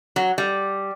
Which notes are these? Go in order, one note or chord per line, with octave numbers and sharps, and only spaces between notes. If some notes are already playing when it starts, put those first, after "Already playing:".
F#3
G3